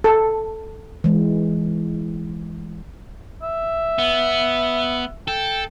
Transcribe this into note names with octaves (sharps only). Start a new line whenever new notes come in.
A4
E3 G#3
E5
B3
A4 G5